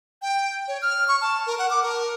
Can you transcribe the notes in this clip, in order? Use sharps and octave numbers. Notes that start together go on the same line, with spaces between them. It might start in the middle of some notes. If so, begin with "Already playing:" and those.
G5
C#5
F6
C#6
A5
A#4
F#5
D6
A#4